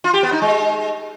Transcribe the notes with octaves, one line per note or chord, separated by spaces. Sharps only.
F4
G4
B3
D#4
G#3